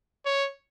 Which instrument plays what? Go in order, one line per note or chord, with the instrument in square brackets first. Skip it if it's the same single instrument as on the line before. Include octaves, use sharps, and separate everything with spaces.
[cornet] C#5